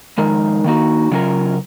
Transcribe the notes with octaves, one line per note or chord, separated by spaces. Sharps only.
F2 D#3 G#3 D#4 A#4
D#3 A#3 D#4 F#4
C#3 F#3 C#4 F4 A#4